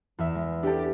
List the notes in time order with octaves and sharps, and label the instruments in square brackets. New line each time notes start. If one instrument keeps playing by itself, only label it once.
[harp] E2 E5
G#3
[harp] D4 A4 [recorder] G4